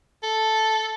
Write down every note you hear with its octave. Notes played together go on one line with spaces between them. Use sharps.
A4